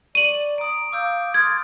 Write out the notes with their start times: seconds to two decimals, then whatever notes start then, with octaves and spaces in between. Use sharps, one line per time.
0.15 D5 C#6 D#7 F#7
0.58 A#5 D#6 D7
0.92 F5 D6 E6 G6
1.34 C6 D#6 F6 G#6 A6